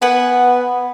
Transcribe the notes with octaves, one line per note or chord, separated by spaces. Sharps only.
B3 B4 F#5 G#5